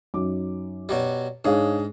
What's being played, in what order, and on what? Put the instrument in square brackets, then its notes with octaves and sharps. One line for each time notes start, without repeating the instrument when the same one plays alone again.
[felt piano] F#2 D#4 D6
[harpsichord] B2 F#3 G3
[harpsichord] G#2 [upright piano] D4 G#4 [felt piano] D#4 C#5 F5